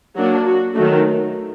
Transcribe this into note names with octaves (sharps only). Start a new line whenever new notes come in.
F#3 A#3 D4 F#4
F#4
D#3 F#3 A3 D#4